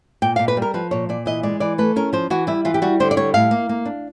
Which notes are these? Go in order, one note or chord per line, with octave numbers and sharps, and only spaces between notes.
A#2 G5
A#2 F5
B4
G3
A#4
F3 B4
A#2 C#5
A#2 D5
E3 D#5
G#3 D5
E3 D5
A3 B4
C#4 A#4
F3 C5
E3 F#4
G3 E4
E3 F4
G4
G3 F#4
D3 C5
D5
G3 C#5
A2 F5
A#3
A#3
D4